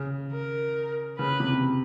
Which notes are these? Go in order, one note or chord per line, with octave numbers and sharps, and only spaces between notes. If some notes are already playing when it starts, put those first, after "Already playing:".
Already playing: C#3
A#4
C#3 B4
C3